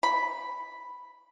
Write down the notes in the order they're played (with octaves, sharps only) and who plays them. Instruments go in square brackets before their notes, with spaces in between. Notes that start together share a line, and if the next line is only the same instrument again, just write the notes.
[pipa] B5